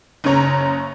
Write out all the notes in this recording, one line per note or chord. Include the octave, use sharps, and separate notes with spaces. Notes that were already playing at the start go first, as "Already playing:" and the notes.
F#1 C#3 C#5 A#5